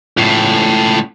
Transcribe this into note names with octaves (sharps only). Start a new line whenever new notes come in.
C#2 A2